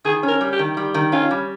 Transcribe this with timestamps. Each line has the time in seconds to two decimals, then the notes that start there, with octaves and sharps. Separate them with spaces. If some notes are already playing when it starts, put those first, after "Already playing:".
0.05 D#3 G#4
0.23 C#4
0.28 A#4
0.41 G3
0.53 G4
0.59 D#3
0.77 G3
0.94 D#3
1.12 C#4 F4
1.31 G3